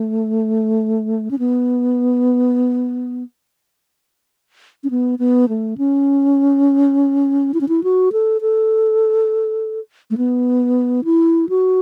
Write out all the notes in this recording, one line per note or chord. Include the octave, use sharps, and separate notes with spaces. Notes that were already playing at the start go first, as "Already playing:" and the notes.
Already playing: A3
C#4
B3
C#4
B3
B3
A3
C#4
E4
C#4
E4
F#4
A4
A4
A3
B3
E4
F#4